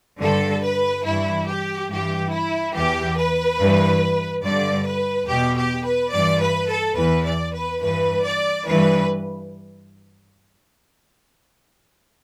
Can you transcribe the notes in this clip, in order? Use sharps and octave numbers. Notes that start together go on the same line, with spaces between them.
G2 D3 A4
B4
G2 E3 E4
G4
G2 E3 G4
E4
E2 E3 G4
B4
G2 E3
G2 D3 D5
B4
E2 B2 G4
G4
B4
G2 E3 D5
B4
A4
E2 E3 B4
D5
B4
G2 E3 B4
D5
G2 E3 B4